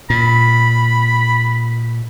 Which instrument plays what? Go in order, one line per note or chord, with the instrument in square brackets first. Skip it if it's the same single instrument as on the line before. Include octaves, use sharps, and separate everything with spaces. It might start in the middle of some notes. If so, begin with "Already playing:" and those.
[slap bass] A#2 [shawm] B5